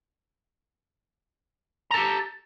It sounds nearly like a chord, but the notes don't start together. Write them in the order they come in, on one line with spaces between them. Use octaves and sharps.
A#5 A4 G4